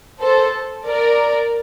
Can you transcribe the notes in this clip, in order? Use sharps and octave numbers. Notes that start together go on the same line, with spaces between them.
A4 C5
A#4 D5